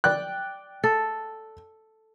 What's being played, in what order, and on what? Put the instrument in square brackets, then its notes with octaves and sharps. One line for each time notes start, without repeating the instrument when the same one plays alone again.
[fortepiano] D5 G5 F#6
[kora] A4